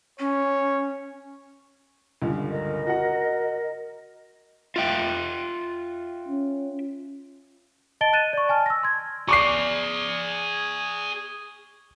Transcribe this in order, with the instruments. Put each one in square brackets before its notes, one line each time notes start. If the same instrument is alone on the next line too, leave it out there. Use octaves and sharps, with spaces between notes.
[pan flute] C#4 [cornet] C#5
[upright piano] C#2 G2 D3
[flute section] A#4 D#5
[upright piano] F#4 F#5
[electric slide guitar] F4 E5 G5
[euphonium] C#4
[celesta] D#5 A5 A6 D7 G7
F#6 A6 D#7 E7
D5 C#6
G#5 A5 F6
E6 A#6
C6 G#6
[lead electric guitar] G#4 D5 [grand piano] C#6 D6 C7